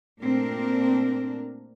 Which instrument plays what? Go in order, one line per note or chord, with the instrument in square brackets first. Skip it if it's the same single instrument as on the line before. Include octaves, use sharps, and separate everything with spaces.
[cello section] A#2 A3 C4 D4 A#4